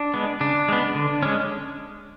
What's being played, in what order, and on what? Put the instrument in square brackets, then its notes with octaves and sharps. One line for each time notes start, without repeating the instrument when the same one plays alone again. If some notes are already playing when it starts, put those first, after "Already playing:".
Already playing: [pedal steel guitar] D4
G#3 B3
C#3 D4
G#3 B3
D3
G#3 C#4